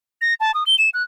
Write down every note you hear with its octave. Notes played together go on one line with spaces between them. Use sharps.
A#6
A5
D#6
G7
E7
F#6